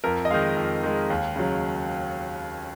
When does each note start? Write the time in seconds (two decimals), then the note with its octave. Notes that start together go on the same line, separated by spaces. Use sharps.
0.04 F2 A#4
0.25 D#5
0.31 D#3 G#3 F5
0.57 F2
0.83 D#3 G#3
1.10 D#2
1.36 C#3 F#3